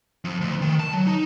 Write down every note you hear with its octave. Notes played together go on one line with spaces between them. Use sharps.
F2
D2
D#3
A5
F#3
D#4